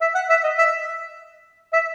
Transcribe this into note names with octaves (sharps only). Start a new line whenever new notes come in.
E5
F#5
E5
D#5
E5
E5